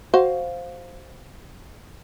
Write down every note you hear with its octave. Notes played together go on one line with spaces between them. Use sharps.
F#4 C5 F5